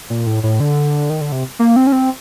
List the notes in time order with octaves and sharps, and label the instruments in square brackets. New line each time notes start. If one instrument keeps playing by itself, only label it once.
[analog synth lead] A#2
A2
A2
D3
D#3
D3
C3
A#3
C4
C#4
C4